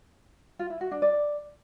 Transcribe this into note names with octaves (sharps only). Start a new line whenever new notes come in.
F4
E4
F#4
D4
D5